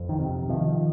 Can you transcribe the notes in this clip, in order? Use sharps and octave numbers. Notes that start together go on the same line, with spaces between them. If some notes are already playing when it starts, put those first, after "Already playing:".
Already playing: F2
D#3
C3
C3 D#3 F3